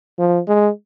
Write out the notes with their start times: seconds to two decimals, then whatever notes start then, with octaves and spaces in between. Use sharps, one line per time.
0.19 F3
0.48 G#3